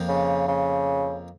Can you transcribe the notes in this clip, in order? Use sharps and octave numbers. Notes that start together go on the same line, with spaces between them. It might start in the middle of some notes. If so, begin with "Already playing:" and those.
Already playing: F2 F3 A#3
C#3
C#3